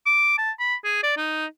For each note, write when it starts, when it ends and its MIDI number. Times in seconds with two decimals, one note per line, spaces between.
0.06 0.37 86
0.38 0.51 81
0.60 0.75 83
0.84 0.98 68
1.03 1.12 74
1.17 1.46 63